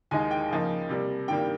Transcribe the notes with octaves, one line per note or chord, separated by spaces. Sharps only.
D#2 D#3 G#3 D#4 G#5
G5
C#2 C#3 F3 A#3 D#4
C3 G3 A#3
G2 D#3 G3 A#3 G5